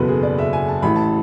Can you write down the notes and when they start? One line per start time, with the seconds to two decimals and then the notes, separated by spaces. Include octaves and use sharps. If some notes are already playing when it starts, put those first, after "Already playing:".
Already playing: F#1 E2 B2 A4 B4
0.08 G#4
0.23 D5
0.38 E5
0.53 G#5
0.69 A5
0.82 A1 A2 E3 B5
0.96 A5